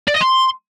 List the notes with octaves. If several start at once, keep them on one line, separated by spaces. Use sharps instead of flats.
D5
D#5
C6